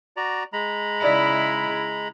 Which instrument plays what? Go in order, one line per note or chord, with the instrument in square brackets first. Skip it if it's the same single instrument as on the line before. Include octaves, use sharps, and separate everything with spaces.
[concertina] F#4 D5 A#5
G#3 A#5 B5
[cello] C#3 E4 [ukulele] D#4 D5 D#5